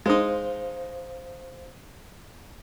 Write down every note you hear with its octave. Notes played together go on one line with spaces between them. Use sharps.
G#3 D#4 C5 F5